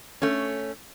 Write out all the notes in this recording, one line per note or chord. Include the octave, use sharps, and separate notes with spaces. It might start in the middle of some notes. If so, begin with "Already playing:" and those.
A3 C#4